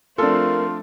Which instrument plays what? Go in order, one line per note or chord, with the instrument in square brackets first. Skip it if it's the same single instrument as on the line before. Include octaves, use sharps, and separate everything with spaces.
[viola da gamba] F3 A3 C4 [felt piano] D4 A4 [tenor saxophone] F4 [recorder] A#4